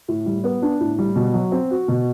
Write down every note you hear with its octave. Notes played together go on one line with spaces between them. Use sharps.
A2
G3
B3
D4
A2
G3
B2
F#3
C4
F#4
B2